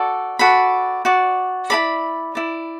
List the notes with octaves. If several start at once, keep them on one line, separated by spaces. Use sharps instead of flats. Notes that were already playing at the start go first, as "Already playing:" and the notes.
Already playing: F#4 A4 D5
F#4 A4 D5 B5
F#4 D5
E4 A4 D5 B5
E4 D5